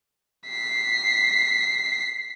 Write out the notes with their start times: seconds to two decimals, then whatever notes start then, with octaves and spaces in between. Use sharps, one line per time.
0.48 B6 C7